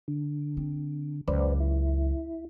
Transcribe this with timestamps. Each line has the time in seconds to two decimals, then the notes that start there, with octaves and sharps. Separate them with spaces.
0.08 D3
0.57 C4
1.28 C#2 F#2 B4 C5 D5
1.60 E4